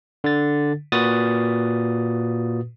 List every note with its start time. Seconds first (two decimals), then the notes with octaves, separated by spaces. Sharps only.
0.24 D3 A6
0.92 A#2 F#4 B4 D#6 A6